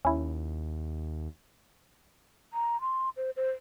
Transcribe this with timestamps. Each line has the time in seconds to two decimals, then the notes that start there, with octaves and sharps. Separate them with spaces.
0.05 D#2 C#4 E4
2.53 A#5
2.81 C6
3.17 C5
3.37 C5